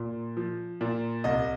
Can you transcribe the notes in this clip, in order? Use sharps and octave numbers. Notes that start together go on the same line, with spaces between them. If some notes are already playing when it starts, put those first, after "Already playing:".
Already playing: A#2
F3
A#2
C2 D#5